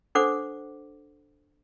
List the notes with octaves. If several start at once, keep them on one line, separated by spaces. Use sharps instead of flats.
D4 A4 C5 F#5 D6